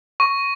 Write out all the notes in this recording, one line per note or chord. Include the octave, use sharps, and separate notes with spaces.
C#6